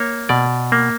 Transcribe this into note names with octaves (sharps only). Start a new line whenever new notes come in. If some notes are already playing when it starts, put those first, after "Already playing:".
Already playing: A#3 C#5
B2 D5
A#3